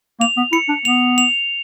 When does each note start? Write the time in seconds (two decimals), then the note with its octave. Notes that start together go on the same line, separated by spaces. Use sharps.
0.20 A#3 F7
0.37 B3
0.53 E4 C#7
0.69 D4
0.85 B3 F7
1.18 F7